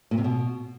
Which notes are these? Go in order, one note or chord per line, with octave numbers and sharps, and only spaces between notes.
A#2
C3
B2